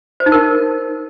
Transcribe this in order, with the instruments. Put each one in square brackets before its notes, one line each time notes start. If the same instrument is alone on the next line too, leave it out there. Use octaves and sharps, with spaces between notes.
[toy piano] C5
D#4
A#4